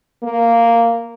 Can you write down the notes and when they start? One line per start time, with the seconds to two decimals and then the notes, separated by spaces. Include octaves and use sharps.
0.23 A#3